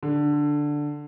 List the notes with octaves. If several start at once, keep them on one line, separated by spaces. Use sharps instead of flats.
D3